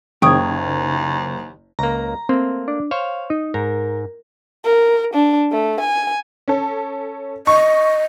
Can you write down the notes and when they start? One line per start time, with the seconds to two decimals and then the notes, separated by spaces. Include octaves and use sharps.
0.22 F#1 D#2 C#3 D#4 G5 C#6 D#6 G#6
1.79 C#2 A#3 A#5
2.29 A3 A#3 C4
2.68 D4
2.91 C5 C#5 F5
3.30 D#4
3.54 G#2 A#4
4.64 A#4
5.14 D4
5.52 A3
5.80 G#5
6.48 C#4 A4
7.47 D#5 C#6